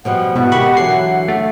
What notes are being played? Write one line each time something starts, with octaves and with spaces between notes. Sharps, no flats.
B2 F3 G3 F#5
G#2 B2 E4
D#3 G4 B5 C#6
D3 E3 F#3 C7
A3